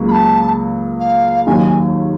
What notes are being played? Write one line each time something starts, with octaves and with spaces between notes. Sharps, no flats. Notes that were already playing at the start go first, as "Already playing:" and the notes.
Already playing: C#2 C#3 F#3 A#3
B5
A5
F5
D#2 D#3 F#3 G#5